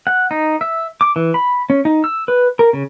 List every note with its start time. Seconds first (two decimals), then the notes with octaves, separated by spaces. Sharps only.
0.07 F#5
0.31 D#4
0.61 E5
1.01 D6
1.16 E3
1.34 B5
1.70 C#4
1.85 D#4
2.04 E6
2.28 B4
2.59 A#4
2.73 C#3